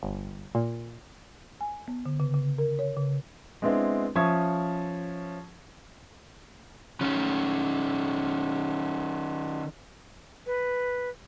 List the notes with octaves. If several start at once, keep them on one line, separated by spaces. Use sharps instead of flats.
G1
A#2
G#5
B3
D3
C#3
C#3
A#4
C#5
C#3
G#3 B3 C4 D4 E4
F3 C#4 E5 C#6 D#6 G#6
D#3 C#4
B4